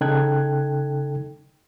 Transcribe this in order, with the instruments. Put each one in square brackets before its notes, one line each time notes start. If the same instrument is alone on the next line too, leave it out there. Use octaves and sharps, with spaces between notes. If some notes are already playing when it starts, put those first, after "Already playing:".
[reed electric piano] C#3 D#4 A4 G5 F#6 G#6